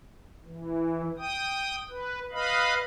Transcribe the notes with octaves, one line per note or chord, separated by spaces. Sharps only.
E3
G5 D#6
B4
B4 D#5 F5 B5